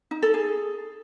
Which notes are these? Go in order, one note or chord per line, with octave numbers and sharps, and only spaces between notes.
D#4
A4
G#4